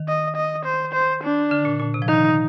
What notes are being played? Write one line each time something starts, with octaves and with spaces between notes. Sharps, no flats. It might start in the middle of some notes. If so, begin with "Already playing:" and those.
Already playing: D#3
D#5
D#5
C5
C5
D4
D3
A#2
A#2
C3
F3
D#3 D#4